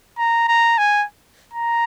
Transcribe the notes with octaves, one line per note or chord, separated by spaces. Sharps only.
A#5
A#5
G#5
A#5